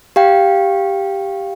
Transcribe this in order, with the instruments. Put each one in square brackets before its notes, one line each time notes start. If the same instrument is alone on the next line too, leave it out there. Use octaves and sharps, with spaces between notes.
[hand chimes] G4 F5 G5